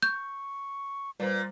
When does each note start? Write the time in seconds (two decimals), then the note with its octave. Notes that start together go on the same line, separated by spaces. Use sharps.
0.03 C#6 G6
1.20 A#2 G3 B4 C5